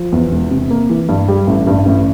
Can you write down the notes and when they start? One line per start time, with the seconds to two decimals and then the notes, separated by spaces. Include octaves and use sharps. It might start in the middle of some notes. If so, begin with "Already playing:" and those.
Already playing: F3
0.12 E2
0.32 E1
0.51 C3
0.71 A#3
0.90 E3
1.09 G2
1.28 G3
1.47 A1
1.67 G2
1.86 A1